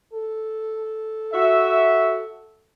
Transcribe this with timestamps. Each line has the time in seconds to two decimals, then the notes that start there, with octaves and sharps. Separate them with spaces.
0.14 A4
1.33 F#4 E5